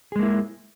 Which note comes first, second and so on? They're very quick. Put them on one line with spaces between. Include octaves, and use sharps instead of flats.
G#4 G#3 A#3 E4